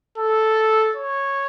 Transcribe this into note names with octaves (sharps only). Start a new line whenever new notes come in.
A4
C#5